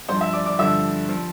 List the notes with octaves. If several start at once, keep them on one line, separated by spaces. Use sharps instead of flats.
G2 F3 C5 C6
E5 E6
D5 D6
D5 D6
G2 D3 F3 E5 E6
F3